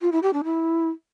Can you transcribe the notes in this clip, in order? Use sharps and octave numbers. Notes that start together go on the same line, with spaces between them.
F4
E4
G4
D4
E4